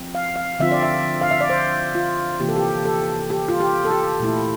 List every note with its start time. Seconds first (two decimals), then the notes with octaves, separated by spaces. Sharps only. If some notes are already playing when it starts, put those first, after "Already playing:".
Already playing: F3 C4
0.15 F5
0.36 F5
0.59 D3 F3 C4 F4 E5
0.72 D5
0.83 E5
1.21 F5
1.31 E5
1.41 D5
1.50 C5
1.95 F4
2.40 C3 E3 A#3 F4 G4
2.49 A4
2.56 G4
2.85 A4
3.30 G4
3.48 F4
3.60 G4
3.85 A4
3.91 G4
4.20 A#2 A3 E4